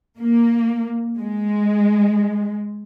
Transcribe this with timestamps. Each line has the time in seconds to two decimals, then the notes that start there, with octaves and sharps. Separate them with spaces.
0.20 A#3
1.17 G#3